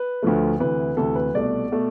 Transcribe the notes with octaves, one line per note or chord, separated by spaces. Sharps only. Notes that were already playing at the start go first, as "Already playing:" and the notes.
Already playing: B4
D2 D3 F3 A3
D2 C3 E3 B4
D2 C3 E3 A4
B4
C2 B2 A3 D5
B2 A3